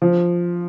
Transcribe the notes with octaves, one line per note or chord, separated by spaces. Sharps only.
F3